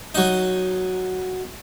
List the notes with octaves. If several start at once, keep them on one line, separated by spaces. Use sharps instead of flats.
F#3 D#4